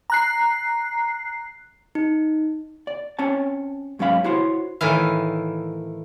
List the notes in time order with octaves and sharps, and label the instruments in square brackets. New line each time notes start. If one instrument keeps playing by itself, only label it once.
[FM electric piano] A#5 F#6 C7
[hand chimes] D#4
[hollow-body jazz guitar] D5
C4 C#4 C#5 A5
G#2 F#3 C#4 F5 B5
E4 F#4 C5 C#5
[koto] A2 D#3 E3 F5